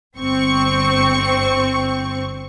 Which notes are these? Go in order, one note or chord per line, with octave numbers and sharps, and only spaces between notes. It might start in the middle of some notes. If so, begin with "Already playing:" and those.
G1 C4 C#6